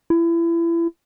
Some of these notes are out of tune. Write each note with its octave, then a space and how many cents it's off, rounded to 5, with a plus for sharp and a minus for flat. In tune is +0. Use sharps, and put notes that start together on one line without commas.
E4 +30